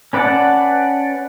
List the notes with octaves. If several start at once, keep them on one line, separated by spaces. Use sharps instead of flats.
C#4 B4 D5 F#5 A5